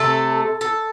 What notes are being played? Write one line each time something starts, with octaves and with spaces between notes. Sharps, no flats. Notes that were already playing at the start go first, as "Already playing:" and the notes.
Already playing: C3 A3 A4
A4